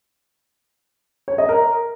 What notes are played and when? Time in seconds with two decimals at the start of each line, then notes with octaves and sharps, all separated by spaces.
1.28 C#5
1.38 D#5
1.49 A#4